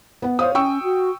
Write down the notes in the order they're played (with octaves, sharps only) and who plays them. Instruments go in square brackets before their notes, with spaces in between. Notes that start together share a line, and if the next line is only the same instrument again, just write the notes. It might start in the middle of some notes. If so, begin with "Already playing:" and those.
[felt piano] B3 F#5
[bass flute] C5 [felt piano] C#5 F5 D#6
[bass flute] C#4 [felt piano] G5 C#6 E6
[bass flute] F#4